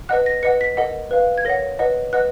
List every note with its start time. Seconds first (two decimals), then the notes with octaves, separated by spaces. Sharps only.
0.09 B4 D#5 F#5 F#6
0.26 A#6
0.43 B4 D#5 F#5 C#7
0.61 B6
0.77 A#4 D#5 F#5
1.11 B4 F5
1.38 G#6
1.45 A#4 C#5 F#5 A#6
1.79 B4 D#5 F#5
2.13 B4 D#5 F#5 F#6